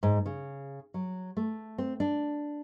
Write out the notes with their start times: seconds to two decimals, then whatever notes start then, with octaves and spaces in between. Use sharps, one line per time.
0.03 G#2
0.26 C#3
0.94 F#3
1.37 A3
1.78 C4
2.00 D4